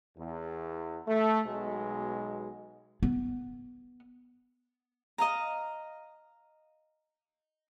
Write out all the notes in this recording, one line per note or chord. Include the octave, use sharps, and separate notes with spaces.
E2
A3
B1 B2 G#3
B3
D#5 F5 A#5